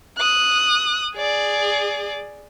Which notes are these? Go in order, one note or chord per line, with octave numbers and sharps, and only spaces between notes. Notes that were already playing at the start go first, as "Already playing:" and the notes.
D#6 F#6
G#4 D5